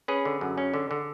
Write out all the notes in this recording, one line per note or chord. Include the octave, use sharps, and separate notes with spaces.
C#4 G#4 B4
D3
F#2
C#4
D3
D3